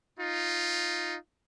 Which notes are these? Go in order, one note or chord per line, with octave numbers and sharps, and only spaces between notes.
D#4 F4